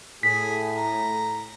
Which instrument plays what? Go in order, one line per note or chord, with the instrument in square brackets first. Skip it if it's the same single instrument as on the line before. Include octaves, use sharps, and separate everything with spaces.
[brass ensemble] A2 [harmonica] G#4 [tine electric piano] B6
[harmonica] A#5